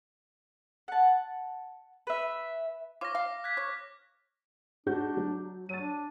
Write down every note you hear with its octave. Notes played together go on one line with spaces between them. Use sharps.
F#5 A5
B4 E5
F4 C#5 D6 F6 A#6
F5
F#6 G#6 B6
C#5
G#2 D4 F#4 G6
F#3
F#3 A6 D#7
D4